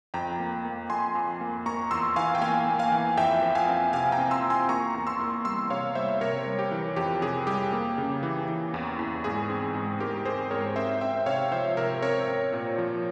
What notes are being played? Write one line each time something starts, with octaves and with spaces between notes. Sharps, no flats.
F2 G5 A#5
A#3
A#3
F2 G#5 C6
F2
A#3
A#3 A#5 C#6
E2 C6 E6
E3 F5 G#5
G5
A#3 F5 G#5
A#3
F5 G#5
E3
F2 E5 G5
F3
F5 G#5
C4
C3 F5 G#5
G5 A#5
C4
C6 E6
C4
G#5 C6
A#3 A#5 C#6
E2
C6 E6
A#3
G3 C6 E6
C3 C#5 F5
G3 C5 E5
C3 A#4 C#5
G3
G4
E3
F2 G4
C3 G#4
G3 G4
A#3
C#3
E3
E3
E2
E2
G#2 G#4
C4
G#2
G#2 G4 A#4
C4 G#4 C5
G#2 A#4 C#5
C4 C5 E5
C4 E5 G5
C3 C#5 F5
F3 C5 E5
C3 A#4 C#5
C4 A#4 C#5
C4
A#2
F3